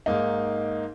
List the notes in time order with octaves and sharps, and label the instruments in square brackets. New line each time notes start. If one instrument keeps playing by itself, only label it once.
[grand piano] G#2 A#3 D#4